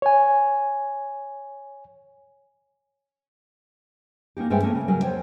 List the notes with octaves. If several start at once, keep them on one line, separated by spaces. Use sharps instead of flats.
C#5 G#5
A#3 C#4 D#4 G4
G2 G#3 C#4 C5 E5 G5
A3 A#3 C#4
C#3
F#3 G3 A#4 G#5
F2 C5 C#5 G5